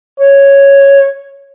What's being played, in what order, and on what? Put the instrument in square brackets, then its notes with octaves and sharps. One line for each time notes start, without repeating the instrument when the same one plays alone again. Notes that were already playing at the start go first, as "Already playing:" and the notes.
[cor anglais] C#5